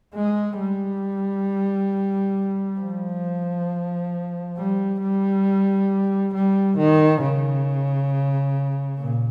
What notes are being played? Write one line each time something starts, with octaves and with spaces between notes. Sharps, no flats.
G#3
G3
F3
G3
G3
G3
D#3
C#3
A#2